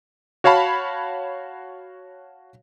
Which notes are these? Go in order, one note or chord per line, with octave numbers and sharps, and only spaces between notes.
F#4 C#5 F5 A5 B5